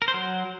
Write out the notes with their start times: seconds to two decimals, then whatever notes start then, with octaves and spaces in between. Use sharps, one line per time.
0.02 A#4
0.08 C5
0.14 F#3